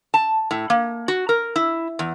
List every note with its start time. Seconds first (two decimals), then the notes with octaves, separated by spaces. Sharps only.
0.14 A5
0.51 A2
0.70 A#3
1.08 F#4
1.29 A#4
1.56 E4
1.99 E2